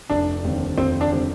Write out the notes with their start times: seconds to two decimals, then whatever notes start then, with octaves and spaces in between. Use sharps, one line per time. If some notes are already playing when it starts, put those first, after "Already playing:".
0.10 F1 D4
0.44 D#2 D3 G3 C4
0.78 F1 C4
1.01 D4
1.13 D3 G3 C4